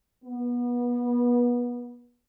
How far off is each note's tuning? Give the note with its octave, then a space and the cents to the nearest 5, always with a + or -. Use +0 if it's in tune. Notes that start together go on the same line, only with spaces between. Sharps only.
B3 -25